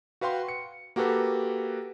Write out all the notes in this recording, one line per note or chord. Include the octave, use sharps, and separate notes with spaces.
F#4 B4 F5 G5 C6
C#7
A#3 F#4 G4 A4 B4